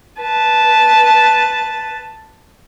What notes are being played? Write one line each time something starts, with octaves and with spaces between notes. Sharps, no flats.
B4 A5